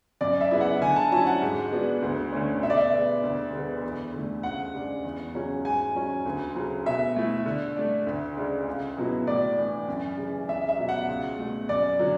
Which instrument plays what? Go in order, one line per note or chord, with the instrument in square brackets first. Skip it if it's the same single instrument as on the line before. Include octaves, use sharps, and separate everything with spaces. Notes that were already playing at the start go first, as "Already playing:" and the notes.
[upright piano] F#2 [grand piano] D5
[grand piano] E5
[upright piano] C#3 G#3 B3 E4
[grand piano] F#5
[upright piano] D3 [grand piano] G#5
[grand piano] A5
[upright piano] F#3 C#4 E4 [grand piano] A5
[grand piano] F#5
[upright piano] G#2
G#3 B3 D4 F#4
D2
D3 A3 C#4
[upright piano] B2 [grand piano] E5
[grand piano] D5
E5
[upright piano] G#3 B3
D2
D3 G#3 B3
E2
D3 A3
[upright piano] C#2 [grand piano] F#5
[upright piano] C#3 G#3 D4
E2
C#3 F#3 C#4 F#4
[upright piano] G#2 [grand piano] G#5
[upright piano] F#3 C#4
D2
C#3 F#3
[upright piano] B2 [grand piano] E5
[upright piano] A3 E4
D3
A3 D4
D2
C#3 G#3 D4
C#2
B2 F#3 B3 E4
[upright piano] A2 [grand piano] D5
[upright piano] E3 A3 D4
F#2
C#3 E3
[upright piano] C#2 [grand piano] E5
[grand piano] E5
[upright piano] B2 F#3
[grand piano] F#5
[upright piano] C#2
B2 A3
[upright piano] F#2 [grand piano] D5
[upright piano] D3 F#3